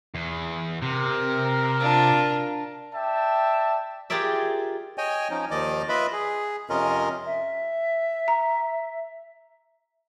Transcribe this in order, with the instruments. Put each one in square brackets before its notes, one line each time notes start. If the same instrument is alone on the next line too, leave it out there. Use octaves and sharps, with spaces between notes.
[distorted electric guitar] E2
[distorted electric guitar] C3 [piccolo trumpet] A#4
[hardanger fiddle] D4 F4
[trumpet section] D5 E5 G5 A5
[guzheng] F4 G4 G#4 A#4 D5 E5
[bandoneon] C#5 D#5 G5 G#5
F3 C#4 D#4
D#2 D#3 F3 D5 D#5 D6
F4 B4 D#5 E5 B5
G#4
F2 C3 C#4 F4 A#4 D#5
[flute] E5
[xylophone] A#5